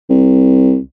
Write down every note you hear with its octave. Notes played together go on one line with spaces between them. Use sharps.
C2